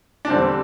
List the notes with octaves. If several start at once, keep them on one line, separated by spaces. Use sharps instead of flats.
D4
E2 D3 G3 C4